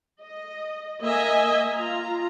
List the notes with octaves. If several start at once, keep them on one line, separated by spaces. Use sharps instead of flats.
D#5
A#3 D#5 E5 G#5
F4 A#5